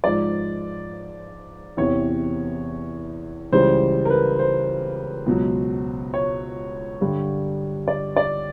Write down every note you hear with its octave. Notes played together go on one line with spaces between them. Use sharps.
G#2 F3 D5
E2 C3 E3 C#5
C#2 C#3 E3 G3 C5
A#4
B4
C5
C#2 B2 F#3
C#5
G2 D3 G3
D5
D5